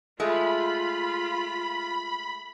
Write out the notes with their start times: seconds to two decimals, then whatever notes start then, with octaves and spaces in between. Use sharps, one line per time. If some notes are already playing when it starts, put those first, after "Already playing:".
0.20 G#3 A3 F4 B5